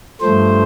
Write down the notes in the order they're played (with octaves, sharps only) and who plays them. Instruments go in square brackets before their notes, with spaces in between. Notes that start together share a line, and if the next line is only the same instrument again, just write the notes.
[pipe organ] G2 F3 A3 C5